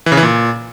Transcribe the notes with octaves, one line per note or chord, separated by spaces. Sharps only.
E3
C#3
E3
A#2